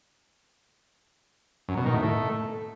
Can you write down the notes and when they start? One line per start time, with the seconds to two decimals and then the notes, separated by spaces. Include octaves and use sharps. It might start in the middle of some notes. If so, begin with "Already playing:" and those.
1.69 F#2
1.77 B2
1.86 D#3
1.94 A2
2.02 A3